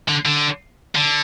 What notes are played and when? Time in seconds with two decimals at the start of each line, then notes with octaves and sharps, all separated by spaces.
0.09 D3
0.25 D3
0.95 D3